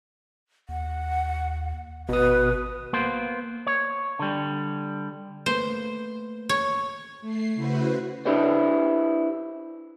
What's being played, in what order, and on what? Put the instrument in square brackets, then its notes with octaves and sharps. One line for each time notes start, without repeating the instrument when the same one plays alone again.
[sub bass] D#2 [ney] F#5
[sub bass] G#1 [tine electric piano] B2 D#6 [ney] B4
[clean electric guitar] A#3 B3 C5
C#5
D3 G3
[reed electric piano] A3 A#3 B4 [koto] C5
[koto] C#5
[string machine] A3 C7
C#3 E4 F#4 B4 C5
[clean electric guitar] D4 E4 G4 B4 C5 D5